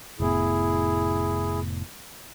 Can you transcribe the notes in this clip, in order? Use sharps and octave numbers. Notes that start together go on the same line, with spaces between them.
F1 A2 B3 E4 G#4